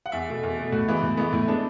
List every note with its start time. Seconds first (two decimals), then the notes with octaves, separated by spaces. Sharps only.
0.06 F#5
0.12 E2 E5
0.28 B2 A3
0.43 E2
0.57 B2 A3
0.72 A2 F#4
0.88 E3 G#3 B3
1.02 A2
1.17 E3 G#3 B3
1.33 A2 E4
1.48 G#3 B3 D4